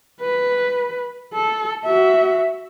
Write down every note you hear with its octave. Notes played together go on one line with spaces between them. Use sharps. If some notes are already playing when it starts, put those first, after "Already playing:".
B4
A4
F#4 E5